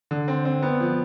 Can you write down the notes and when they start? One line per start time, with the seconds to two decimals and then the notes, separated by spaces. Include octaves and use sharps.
0.11 D3
0.28 C4
0.45 C4
0.63 B3
0.80 F3